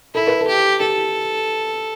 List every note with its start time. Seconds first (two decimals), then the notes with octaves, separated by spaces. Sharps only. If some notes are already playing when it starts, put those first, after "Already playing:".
0.14 E4 A4
0.27 B4
0.41 A4
0.48 G4
0.80 G4 A4